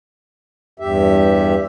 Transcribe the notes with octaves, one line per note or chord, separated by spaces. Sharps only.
E2 G2 G4 E5